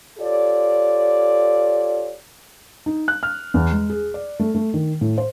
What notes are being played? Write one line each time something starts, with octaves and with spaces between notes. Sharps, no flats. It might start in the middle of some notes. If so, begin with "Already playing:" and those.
F4 G4 A4 C#5 D5
D#4
F#6
F6
E2
G#3
G#4
D5
A3
A3
D#3
A2
C5